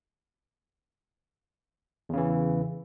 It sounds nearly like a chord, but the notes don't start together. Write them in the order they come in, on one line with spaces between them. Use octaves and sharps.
E2 C#3 E3